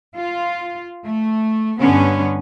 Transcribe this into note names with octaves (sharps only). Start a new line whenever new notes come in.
F4
A3
G2 D3 B3 C#4